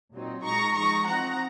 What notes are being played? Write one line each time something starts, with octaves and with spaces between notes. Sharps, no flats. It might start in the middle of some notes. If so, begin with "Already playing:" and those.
A#2 F#3 C4 D#4
A#2 G#3 D#4 A#5 C#6
F3 G#3 D#4 A#5 C#6
F3 C4 D#4 F#5 A#5